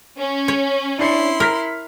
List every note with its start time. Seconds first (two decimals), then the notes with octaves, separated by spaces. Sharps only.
0.18 C#4
0.48 C#5 C#7
0.99 D4 E4 C6 C7 C#7
1.40 A#4 F6 B6